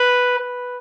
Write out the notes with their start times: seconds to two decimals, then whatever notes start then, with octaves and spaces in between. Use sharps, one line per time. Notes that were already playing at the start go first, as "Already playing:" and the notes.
Already playing: B4
0.39 B4